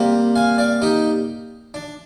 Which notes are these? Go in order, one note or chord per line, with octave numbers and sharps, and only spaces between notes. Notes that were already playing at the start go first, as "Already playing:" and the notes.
Already playing: C3 G3 A#3
F5 G#5
D5 F5
D#4 G4
D4